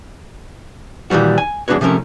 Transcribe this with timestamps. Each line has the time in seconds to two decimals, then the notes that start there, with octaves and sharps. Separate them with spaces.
1.10 A#2 D#3 E3 G3 F#4
1.38 G#5
1.68 E2 G#3 D4 F#4 B4 C#5
1.81 C3 F3 A3 C#4 A#4